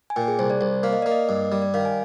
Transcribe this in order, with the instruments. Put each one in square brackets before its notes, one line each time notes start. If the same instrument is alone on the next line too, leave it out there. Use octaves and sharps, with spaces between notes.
[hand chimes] G#5
[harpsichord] A#2 [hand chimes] G5
[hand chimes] G#4
[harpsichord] C2 [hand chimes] C5
[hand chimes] D5
[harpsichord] C2 [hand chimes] C5
[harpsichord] A#3 [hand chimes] F5
[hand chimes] D#5
[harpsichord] A#3 [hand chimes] D5
[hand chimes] D#5
[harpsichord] G2
[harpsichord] G3 [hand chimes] D5
[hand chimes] D5
[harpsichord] D#3 [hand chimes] F5
[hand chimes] G#5